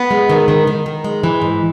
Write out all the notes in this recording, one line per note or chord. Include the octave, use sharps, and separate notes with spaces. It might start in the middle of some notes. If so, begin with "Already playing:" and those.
Already playing: B3
G#3
D#3
D#3
D#3
D#3
G#3
E3
G#2